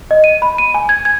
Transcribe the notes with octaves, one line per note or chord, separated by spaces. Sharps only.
D#5
D#7
B5
D#7
G#5
G#6
G#6